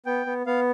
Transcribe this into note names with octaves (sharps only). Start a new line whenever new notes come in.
B3 G5
B3
B3 F5